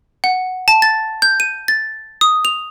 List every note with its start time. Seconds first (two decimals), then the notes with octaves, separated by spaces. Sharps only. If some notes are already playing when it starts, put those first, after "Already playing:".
0.24 F#5
0.68 A5
0.82 A6
1.22 G6
1.40 D#7
1.68 A6
2.21 D#6
2.45 F7